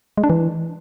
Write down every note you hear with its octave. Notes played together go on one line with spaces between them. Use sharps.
G#3
D4
E3